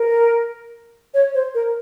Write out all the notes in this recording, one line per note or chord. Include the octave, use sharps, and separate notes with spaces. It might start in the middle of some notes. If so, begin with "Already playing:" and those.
Already playing: A#4
C#5
C5
A#4